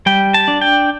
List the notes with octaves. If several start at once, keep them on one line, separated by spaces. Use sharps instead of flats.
G3 G5
A5
D4
G5